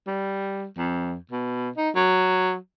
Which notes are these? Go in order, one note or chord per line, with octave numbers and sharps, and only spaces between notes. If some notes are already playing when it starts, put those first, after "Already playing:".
G3
F2
B2
D#4
F#3